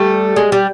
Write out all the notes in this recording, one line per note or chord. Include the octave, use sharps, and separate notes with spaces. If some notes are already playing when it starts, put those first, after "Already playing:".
Already playing: G3 A3
G#3
G3